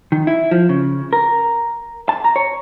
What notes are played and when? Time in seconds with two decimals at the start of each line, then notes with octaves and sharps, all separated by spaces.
0.12 D#3
0.27 E4
0.51 F3
0.69 C#3
1.13 A#4
2.09 A5
2.24 A#5
2.36 C#5